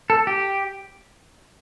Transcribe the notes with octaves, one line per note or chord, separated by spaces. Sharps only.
A4
G4